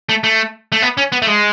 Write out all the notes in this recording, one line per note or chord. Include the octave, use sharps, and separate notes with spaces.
A3
A3
A3
B3
C#4
B3
A3
G#3